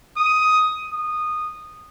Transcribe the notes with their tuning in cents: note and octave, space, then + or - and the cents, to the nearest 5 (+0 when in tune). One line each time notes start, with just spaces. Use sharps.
D#6 +10
D#6 -15